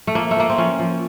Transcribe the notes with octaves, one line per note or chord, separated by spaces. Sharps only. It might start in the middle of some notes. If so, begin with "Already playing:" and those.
A3
F3 A#3
A3
F3 A#3
C4
F3 C#4
F3